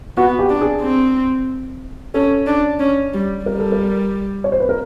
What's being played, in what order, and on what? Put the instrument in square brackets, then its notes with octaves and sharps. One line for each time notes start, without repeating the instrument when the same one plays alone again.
[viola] B3 [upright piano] F#4
[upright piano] G4
[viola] D4
[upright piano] G#4
[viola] C4
[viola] C#4 [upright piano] A4
[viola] D4
C#4
G3
[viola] G3 [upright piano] A#4
[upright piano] A4
A#4
C#5
C5
B4
A#4